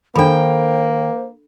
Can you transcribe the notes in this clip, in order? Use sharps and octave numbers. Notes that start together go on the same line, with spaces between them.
D#3 A#3 D4 A4 C5 G5 B5